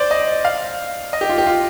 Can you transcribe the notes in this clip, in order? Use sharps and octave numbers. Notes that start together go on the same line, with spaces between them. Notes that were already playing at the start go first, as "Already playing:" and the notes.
Already playing: C5 D5
D#5
F5
D#5
G4
F4
G4
F4